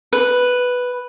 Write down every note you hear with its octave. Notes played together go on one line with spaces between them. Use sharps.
B4